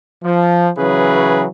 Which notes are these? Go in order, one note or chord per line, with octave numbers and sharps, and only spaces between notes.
F3
C#3 E3 F#3 C#4 G#4 B4